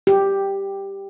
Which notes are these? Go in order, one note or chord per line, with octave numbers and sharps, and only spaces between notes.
G4